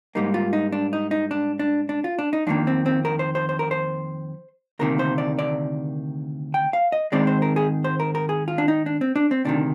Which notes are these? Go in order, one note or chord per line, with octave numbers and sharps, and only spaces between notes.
G#2 G3 A#3 D#4
F4
D#4
D4
D#4
D#4
D4
D4
D4
F4
D4
D#4
F2 D#3 A#3 D4
C4
C4
A#4
C5
C5
C5
A#4
C5
D2 C3 D#3 A#3 A#4
C5
D5
D5
G5
F5
D#5
G#2 D#3 G#3 C4 D5
C5
A#4
G#4
C5
A#4
A#4
G#4
F4
D4
D#4
D4
C4
D4
C4
D2 C3 D#3 D4